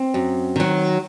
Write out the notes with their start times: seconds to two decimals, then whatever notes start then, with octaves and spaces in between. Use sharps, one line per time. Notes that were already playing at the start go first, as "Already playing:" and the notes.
Already playing: C4
0.14 F#2
0.56 D#3 F#3